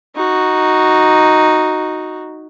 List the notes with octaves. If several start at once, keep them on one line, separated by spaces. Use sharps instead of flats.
D#4 F#4